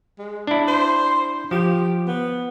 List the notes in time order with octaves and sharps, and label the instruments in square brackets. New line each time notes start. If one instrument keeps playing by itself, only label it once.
[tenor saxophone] G#3
[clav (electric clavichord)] D4 E4
[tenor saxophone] C5
[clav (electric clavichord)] F3 [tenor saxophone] G4
[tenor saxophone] B3